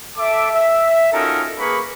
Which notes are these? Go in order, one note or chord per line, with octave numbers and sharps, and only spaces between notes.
A4 E5 D6
E5
C#4 D#4 F4 F#4 A4 A#4
A#3 G#4 A#4 B4 B5 C#6